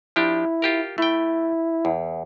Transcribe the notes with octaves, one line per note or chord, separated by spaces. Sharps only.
F3 D4 E4 G4
F4 G4 A#4
A3 E4 G5
E2